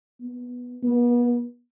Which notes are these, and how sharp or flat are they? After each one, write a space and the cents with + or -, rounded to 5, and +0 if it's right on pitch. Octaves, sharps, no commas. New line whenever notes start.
B3 -10
B3 -35